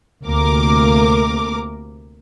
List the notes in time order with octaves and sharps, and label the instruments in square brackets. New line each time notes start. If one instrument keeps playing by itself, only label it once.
[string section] D2 C3 A#3 A#4 D6